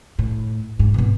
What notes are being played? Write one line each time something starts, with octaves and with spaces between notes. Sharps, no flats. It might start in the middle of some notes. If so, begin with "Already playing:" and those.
A2
G#2
G#1 B2